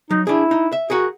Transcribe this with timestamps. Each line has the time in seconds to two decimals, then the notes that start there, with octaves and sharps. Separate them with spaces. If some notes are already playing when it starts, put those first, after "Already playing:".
0.11 F#3 D#4
0.27 D4 E4 G#4
0.51 D#4
0.72 E5
0.90 F#4 G#4 A#4 F#5